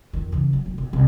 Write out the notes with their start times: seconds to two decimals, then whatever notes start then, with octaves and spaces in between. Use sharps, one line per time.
0.13 F2 D#3
0.32 C#3 E3
0.53 F#3
0.66 D1
0.78 B1
0.93 C2